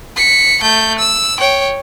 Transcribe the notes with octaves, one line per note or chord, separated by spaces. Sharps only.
B6 C#7
A3 G6
E6
C#5 G5